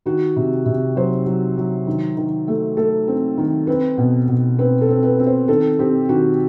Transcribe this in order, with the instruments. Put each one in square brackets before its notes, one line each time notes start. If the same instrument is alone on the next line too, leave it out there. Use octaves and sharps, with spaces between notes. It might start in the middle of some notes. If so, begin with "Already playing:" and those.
[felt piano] D#3 F#4
C3
C3
F#3 C5
F#3
F#3
D#3
D#3
A3
A3 A4
C4
D#3
C4 B4
B2
B2
C4 B4
A4
C4
B4
C4
C5
D#3 A4
C4 G4
D#3 F#4